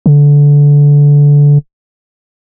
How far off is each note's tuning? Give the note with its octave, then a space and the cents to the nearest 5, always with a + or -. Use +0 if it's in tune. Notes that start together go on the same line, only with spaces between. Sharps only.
D3 -20